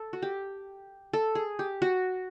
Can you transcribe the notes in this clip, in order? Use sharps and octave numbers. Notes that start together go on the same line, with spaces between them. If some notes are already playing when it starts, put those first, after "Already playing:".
Already playing: A4
F#4
G4
A4
G#4
G4
F#4